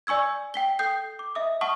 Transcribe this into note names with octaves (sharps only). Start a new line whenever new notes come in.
D5 G#5 C#6 E6 G#6
G5 B6 G7
A4 G5 D#6 G6 C7
D6
D#5 E5 D#6
F#5 A5 C#6 D#6 F6